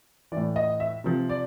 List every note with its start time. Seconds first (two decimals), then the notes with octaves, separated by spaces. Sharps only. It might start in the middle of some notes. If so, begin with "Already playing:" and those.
0.32 A2 E3 D5
0.56 D#5
0.80 E5
1.04 C3 F3
1.30 D5